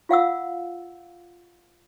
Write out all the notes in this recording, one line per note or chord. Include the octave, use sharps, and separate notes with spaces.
F4 F5 F#5 E6